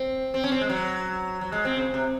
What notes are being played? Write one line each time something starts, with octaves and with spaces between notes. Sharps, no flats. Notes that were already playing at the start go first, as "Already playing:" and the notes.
Already playing: C4
C4
C#4
C4
G#3
F#3
F#3
G#3
C4
C#3
C3